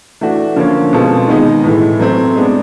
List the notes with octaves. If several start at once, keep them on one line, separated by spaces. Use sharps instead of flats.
E3 A3 D4 F#4
D3 F3 A#3 C#4
B2 G#3 C4 F4 A4
D#3 G#3 B3 D#4
A2 E3 A3
F#3 A3 C4
G#3 B3 D4